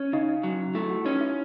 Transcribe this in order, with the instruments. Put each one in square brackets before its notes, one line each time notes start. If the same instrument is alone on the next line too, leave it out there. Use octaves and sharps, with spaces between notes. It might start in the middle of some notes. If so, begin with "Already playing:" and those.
Already playing: [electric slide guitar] C#4
[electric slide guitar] C#3 [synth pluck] D#4
[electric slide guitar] F#3
[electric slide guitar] A3 [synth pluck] E4
[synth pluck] F#4
[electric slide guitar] C#4 [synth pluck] D#4
[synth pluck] E4